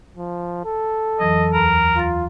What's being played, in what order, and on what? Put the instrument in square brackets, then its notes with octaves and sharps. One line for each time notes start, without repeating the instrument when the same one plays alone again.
[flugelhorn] F3
A4
[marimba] F2 E3 F#3 [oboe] D#5
[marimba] D#2 B5 [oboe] A#4
[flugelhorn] F4 [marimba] A#5 A6